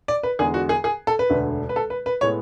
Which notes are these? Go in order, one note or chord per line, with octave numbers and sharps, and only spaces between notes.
D5
B4
E2 D3 G#3 G#4
F#4
G#4
G#4
A4
B4
E1 D2 D3 A3
B4
A4
B4
B4
A2 G#3 B3 C#5